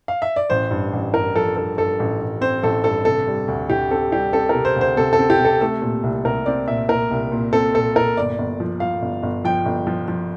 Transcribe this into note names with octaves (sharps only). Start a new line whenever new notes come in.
F5
E5
D5
A1 C5
G2
A1
G2 A#4
F3 A4
G2 A4
G2 A4
A1
A1
C4 C5
A1 A4
G2 A4
C3 A4
G3
D2
D2 G4
C4 A4
G3 G4
C4 A4
A#4
C3
C5
D2
C5
C3 A4
A4
C4
G4
C3
A4
A3 A4
A#2
C2
C2 A#4
C4 D5
A#2 E5
A#2 A#4
C2
A#2
C4 A4
A#2 A4
A#2 A#4
G1 D5
G1
F3
F3 F5
G1
G1
F3 G5
G1
F3
F3